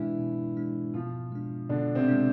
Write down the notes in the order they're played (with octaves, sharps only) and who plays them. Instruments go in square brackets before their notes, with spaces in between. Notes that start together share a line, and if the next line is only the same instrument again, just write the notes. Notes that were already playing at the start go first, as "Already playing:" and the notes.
Already playing: [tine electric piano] B2 G#3 D4 [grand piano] E3 E4
[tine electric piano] B2
G#3 D4
[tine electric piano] B2 [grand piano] F3 F4
[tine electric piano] G#3 D4
[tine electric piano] B2 [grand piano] D3 D4
[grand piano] C3 C4
[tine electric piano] G#3 D4